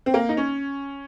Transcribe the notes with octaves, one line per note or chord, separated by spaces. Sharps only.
C4
A#3
D#4
C#4